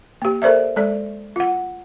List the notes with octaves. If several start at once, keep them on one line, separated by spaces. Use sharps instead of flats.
A#3 G4
A4 A#4 C5 D5 E5
G#3 A4 D5
F4 F#5